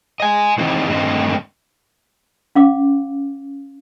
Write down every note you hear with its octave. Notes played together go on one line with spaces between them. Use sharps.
D#5 G#5
D#3 E3 C4 D#4 G4 D#5
G2 D3 D#3 A3 C4 D#5
C#4 F5 D6